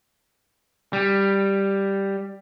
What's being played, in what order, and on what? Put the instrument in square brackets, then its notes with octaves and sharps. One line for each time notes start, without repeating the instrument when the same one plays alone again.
[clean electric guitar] G3